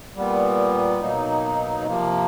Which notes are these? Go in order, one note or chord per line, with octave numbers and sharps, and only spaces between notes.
A#2 G3 B3
B2 F#3 A#3 D#4
C3 F3 A#3